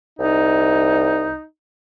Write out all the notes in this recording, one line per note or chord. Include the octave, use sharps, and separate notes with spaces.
C2 D#4